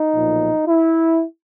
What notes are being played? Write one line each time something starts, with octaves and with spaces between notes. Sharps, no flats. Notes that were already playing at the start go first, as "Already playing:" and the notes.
Already playing: D#4
B1 A#2 F3
E4